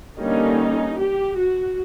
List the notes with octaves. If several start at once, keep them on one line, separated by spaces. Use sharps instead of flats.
D3 G3 A#3 C#4 D#4
G4
F#4